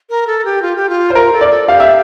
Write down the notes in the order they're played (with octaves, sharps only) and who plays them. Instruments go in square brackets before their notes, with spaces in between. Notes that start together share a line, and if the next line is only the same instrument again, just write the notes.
[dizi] A#4
A4
G4
F4
G4
F4
[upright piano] C5
[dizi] F4 [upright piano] A#4
[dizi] A4
[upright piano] D5
[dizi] A4
[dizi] G4 [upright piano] F5
[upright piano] E5